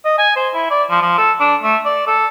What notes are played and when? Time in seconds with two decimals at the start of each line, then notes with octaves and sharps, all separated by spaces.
0.05 D#5
0.18 G#5
0.36 C5
0.54 E4
0.71 D5
0.90 F3
1.02 F3
1.18 A4
1.40 D4
1.63 A3
1.85 D5
2.07 A4